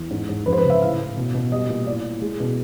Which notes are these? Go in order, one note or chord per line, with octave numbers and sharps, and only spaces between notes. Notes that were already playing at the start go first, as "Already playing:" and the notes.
Already playing: E2
G#2
G#2
F2 B4
C5
B4
C#3
E5
A2 F5
A2
B2
B2
G3 D#5
A#2
A2 D5
A2
G#3
B2